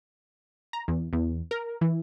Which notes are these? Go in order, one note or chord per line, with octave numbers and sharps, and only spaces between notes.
A#5
E2
E2
A#4
E3